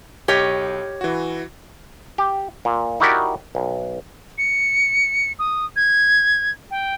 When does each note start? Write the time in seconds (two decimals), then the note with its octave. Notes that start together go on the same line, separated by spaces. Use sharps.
0.28 B1 G4 C#5 D#5 D6 F6
1.01 E3 F#4
2.18 G4
2.65 A#2
3.00 D#4 E4 F#4 G4 A#4 D5
3.55 B1
4.38 C#7
5.39 D#6
5.76 G#6
6.71 G5